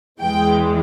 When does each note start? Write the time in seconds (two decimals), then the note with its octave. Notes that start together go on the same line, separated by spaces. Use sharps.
0.20 E2 E3 G#3 G5